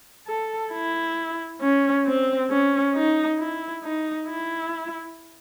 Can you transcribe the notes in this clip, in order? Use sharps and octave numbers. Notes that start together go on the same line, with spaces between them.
A4
E4
C#4
C4
C#4
D#4
E4
D#4
E4